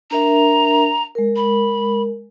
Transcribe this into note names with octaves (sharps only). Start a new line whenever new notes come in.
D4 A#4 E5 A#5
G#3 A#4
B5